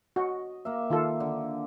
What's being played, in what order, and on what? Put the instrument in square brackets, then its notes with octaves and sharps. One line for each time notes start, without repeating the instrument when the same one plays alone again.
[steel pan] F#4 [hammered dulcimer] D#5
[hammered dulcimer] A#3 E5
[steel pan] D#3 F4 A4
[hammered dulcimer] D3